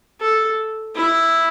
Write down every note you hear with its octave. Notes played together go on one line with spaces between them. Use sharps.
A4
E4